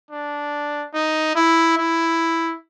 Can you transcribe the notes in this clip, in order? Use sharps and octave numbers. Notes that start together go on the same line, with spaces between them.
D4
D#4
E4
E4